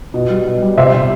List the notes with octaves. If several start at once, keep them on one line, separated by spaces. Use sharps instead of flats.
B2
G3
B2
G3
C3 C5 E5
C3